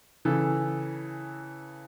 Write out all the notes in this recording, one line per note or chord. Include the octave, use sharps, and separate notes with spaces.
C#3 E3 A4